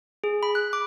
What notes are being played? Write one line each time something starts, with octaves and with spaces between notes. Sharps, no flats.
G#4
B5
F#6
D6